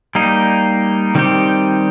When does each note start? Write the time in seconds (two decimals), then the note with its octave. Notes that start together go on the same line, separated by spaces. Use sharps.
0.15 G3 A#3 D#4
1.15 D#3 G3 C4 D#4 G4